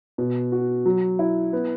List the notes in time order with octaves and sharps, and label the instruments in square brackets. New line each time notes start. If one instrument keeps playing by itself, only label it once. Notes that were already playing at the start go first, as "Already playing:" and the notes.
[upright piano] B2
F#4
F#3
E4
B3